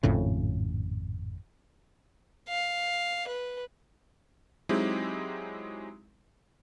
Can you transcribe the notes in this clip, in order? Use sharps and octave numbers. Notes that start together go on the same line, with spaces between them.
G#1 F2 A2 C#3
F5
B4
F#3 G#3 C4 D#4 E4 G4